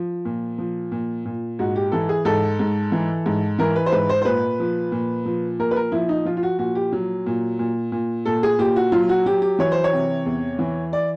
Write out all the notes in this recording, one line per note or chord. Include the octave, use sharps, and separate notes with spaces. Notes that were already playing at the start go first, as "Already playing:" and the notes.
Already playing: F3
A#2
F3
A#2
A#2
G#2 F#4
G4
E3 A4
G#4
G#2 A4
G#2
E3
G#2
E3 A#4
B4
C5
G#2 B4
C5
C5
A#2 B4
F3
A#2
F3
A#2 A#4
B4
A#4
F3 E4
D#4
F3 F4
F4
F#4
A#2 F#4
G4
F#3
A#2
A#2
A#2
A#2 A4
G#4
A#2 G4
F#4
F#3 F4
F#4
F#3 G4
G4
E3 C#5
C5
C#5
C3
E2
E3
D5